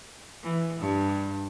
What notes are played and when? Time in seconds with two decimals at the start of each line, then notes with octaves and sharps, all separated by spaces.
0.43 E3
0.80 G2